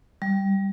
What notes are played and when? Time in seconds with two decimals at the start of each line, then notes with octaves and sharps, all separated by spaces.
0.22 G3